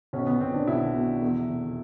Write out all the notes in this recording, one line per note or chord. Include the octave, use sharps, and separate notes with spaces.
B1 C#4
B3
B1 C4
D4
B1 E4
B2
E2
F1